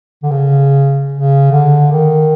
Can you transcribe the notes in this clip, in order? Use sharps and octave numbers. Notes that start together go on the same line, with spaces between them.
D3
C#3
C#3
D3
D#3